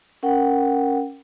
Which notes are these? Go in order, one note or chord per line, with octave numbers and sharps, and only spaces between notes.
C#4 A#4 F#5 G5